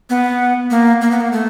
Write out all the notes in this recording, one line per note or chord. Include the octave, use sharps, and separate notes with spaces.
B3
A#3
A#3
B3
A#3
A3